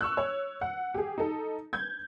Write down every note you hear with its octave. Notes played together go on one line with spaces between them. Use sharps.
C#6 E6 F#6
C#5
F#5
G4 G#4
D#4 A4
G6 G#6